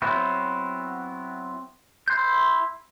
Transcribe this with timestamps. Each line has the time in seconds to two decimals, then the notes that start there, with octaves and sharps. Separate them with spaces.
0.02 F#3 B3 C4 E4 F#4
2.08 E4 C6 G6